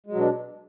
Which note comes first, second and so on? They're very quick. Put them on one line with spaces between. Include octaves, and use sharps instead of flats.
G#3 F#3 B2 D4